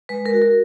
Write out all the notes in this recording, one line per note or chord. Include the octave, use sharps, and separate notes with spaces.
G#3 B4
A#4
F#4
A#4